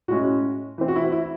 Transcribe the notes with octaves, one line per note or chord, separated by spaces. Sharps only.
A2 G#3 C#4 F#4
E3 C4
F#4
E4
E4